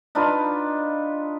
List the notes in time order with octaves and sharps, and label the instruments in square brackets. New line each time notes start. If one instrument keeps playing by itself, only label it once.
[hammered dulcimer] D4 D#4 F4 B4